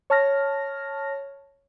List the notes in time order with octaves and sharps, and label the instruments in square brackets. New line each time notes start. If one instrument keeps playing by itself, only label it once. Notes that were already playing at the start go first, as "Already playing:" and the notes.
[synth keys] C#5 A5 F6 A#6